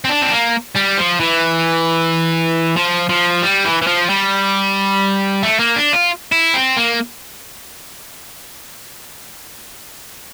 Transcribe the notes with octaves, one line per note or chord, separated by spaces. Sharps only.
C4
D4
C4
A#3
G3
F3
E3
F3
F3
G3
E3
E3
F3
G3
A3
A#3
D4
F4
E4
C4
A#3